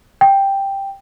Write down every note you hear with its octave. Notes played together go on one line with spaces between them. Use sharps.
G5